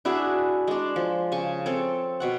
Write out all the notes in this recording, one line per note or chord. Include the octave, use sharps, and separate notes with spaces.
D4 E4 F#4 G#4
G#3 D4
F3
C#3 G#5 C#6
C4 A4 C#5
B2 C#5 F#5